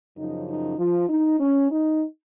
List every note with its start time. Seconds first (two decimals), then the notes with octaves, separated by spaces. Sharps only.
0.17 F#2 C#3 F3 D#4
0.47 D#4
0.78 F3 F4
1.09 D#4
1.40 C#4
1.71 D#4